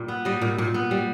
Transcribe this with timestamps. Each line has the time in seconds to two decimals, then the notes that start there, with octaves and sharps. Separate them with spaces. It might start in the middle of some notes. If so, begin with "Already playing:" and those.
Already playing: A#2 G3
0.08 B3
0.25 G3 D#5
0.42 A#2
0.58 A#2
0.74 B3
0.91 G3